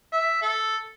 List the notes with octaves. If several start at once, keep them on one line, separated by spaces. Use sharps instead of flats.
E5
A4